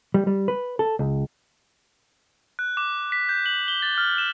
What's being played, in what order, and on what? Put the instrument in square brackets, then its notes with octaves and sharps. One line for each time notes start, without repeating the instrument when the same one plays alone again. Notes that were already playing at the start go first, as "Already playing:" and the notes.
[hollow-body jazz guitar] G3
G3
B4
A4
C#2
[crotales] F#6
D6
B6
G6
F#7
G7
A6
F6
E7